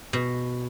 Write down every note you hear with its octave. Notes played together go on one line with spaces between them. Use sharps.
B2